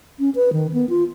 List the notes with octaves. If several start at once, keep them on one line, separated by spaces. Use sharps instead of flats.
C#4
B4
D#3
B3
F4